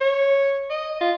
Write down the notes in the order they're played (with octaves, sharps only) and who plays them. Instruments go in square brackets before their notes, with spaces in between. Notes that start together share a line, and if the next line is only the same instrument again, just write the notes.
[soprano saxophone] C#5
D#5
F4